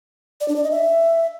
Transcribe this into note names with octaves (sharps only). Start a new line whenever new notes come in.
D5
D4
D5
D#5
E5